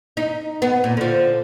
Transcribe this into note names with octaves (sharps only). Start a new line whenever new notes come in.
D#4
B3
A#2
D3 F3